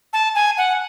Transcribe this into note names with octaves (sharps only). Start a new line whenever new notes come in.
A5
G#5
F#5